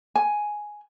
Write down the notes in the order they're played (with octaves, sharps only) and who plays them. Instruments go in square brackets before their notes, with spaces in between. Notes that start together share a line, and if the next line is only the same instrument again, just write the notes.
[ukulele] G#5